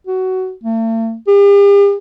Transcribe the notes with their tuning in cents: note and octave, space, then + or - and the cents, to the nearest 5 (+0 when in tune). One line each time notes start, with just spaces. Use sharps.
F#4 +15
A3 +45
G4 +45